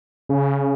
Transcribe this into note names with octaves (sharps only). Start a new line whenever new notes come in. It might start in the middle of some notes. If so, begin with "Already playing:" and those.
C#3